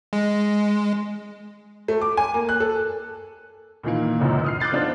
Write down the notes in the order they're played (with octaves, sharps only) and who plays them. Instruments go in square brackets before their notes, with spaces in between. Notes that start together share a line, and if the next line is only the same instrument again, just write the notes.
[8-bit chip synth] G#3
[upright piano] A3
D6
G#5
A#3
F#6
A4
[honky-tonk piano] A#2 D#3 E3 A#3
G1 C#2 F#2 A#2 E3
D#6 F6 C7
D6 F#6 G6 A6 C7
F3 B3 D4 D#4 F4 C5